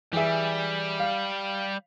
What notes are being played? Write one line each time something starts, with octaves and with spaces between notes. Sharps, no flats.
E3 G3 G#4 E5
F5